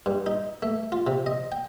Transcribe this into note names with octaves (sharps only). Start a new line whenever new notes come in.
G2
D#4
A3
F4
C3
D#5
G5